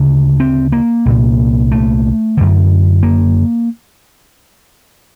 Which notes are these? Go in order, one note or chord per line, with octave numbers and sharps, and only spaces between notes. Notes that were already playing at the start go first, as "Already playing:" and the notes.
Already playing: D2 C#3
C4
A#3
C2 A#2
A3
F#2 D3
A#3